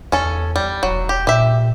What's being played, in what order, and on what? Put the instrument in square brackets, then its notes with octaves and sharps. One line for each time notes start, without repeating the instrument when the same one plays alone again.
[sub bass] E2 [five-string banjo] C#4 A4
[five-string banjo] G3
[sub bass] E1 [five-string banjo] F#3
[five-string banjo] G4
[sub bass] A#2 [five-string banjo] G4 E5